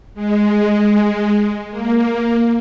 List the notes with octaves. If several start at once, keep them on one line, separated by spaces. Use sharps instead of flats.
G#3
A#3